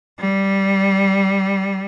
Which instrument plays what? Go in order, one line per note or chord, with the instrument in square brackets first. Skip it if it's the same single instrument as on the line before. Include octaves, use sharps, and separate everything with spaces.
[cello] G3